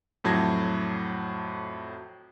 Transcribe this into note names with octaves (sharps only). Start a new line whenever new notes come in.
F2 A2 F#3 A5 G#6 A#6